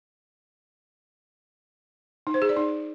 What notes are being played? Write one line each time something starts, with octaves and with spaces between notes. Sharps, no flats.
D#4
C5
G#4
D5
D#4